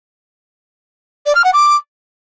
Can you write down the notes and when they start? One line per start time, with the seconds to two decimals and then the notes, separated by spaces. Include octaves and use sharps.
1.26 D5
1.35 F6
1.44 F#5
1.54 D6